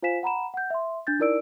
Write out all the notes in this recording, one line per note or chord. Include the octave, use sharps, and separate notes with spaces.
F4 C5 F5 G#5 B6 E7
F#5 A#5 B5 E7
F#5 G6
E5 C6
D4 G6 A6
D#4 E4 A#4 D5 E6 D7